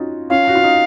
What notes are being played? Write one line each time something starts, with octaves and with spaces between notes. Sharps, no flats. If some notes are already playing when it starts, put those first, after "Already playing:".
Already playing: C#4 D#4 F4 F#4
C#4 F4 F5
F#4
F4
D#4